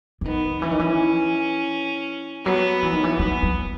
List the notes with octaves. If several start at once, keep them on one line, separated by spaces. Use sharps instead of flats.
E3
D#3 B3
E3 C#4
D#3
E3
F#3 B3
E3
D#3
E3
E3 B3
F#3